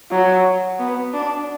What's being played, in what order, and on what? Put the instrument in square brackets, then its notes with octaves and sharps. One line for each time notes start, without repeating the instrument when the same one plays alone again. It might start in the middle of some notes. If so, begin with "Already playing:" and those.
[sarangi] F#3
B3
D4